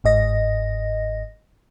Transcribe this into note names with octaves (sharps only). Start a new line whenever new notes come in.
G1 G#2 D#5 A#6